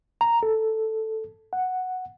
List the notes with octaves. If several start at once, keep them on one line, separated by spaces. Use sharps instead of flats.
A#5
A4
F#5